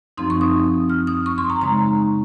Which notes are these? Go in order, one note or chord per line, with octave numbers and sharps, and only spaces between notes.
F#2 F3 C4 D#4 C6
C#6
D#6
F6
D#6
C#6
C6
A#5
C#3 G#3 D#4 A#5